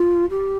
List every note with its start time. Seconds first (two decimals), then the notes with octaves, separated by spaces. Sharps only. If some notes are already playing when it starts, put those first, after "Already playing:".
Already playing: F4
0.30 G4